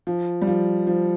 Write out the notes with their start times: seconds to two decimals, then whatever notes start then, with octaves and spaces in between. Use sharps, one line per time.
0.07 F3
0.42 G3
0.48 F3
0.87 F3